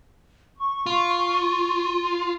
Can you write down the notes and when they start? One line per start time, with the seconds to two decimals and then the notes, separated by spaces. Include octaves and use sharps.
0.57 C#6
0.86 F4